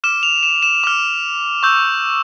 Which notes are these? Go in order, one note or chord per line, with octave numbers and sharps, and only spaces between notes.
D6 F6 E7
F7
E7
E7
D6 F6
C#6 E6 G6